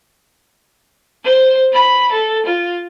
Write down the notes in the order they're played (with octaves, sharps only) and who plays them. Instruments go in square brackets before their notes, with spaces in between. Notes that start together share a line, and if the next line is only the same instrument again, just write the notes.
[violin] C5
B5
A4
F4